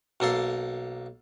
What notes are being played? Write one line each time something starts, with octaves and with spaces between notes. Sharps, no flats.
B1 A#3 A4 C6